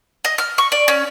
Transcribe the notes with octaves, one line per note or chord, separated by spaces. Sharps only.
D#5
F6
C#6
D5
C#4